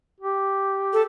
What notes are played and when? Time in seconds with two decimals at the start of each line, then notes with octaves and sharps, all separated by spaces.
0.20 G4
0.93 A4